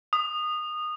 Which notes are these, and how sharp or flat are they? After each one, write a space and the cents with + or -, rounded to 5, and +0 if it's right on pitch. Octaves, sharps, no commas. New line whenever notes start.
D#6 -20